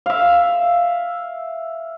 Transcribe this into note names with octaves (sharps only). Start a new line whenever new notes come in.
E5 F5